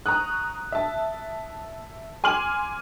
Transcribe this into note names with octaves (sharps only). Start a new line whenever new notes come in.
A#5 C#6 D#6 F#6
E5 A5
G#5 C6 D6 F6 D#7 F#7